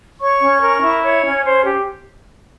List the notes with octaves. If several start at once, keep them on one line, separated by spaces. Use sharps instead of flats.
C#5 C#6
C#4
A#4
E4
C#5
C#4
C5
G4